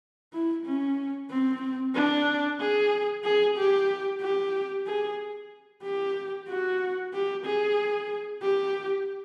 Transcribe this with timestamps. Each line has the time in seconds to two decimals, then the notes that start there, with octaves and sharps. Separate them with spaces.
0.33 E4
0.66 C#4
1.30 C4
1.95 D4
2.59 G#4
3.24 G#4
3.57 G4
4.21 G4
4.86 G#4
5.83 G4
6.48 F#4
7.13 G4
7.45 G#4
8.42 G4